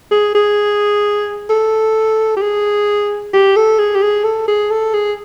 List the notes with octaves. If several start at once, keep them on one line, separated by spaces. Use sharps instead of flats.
G#4
G#4
A4
G4
G#4
G4
A4
G#4
G4
G#4
A4
G#4
A4
G#4